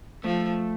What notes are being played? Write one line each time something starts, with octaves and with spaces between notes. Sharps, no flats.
F3 A3